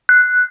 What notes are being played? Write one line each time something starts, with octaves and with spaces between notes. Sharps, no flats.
F#6